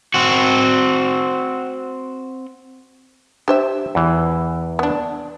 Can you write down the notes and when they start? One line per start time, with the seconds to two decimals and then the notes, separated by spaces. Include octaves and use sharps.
0.14 C4 F#4
3.48 D4 G4 C5 E5
3.95 E2 E3
4.79 B3 D4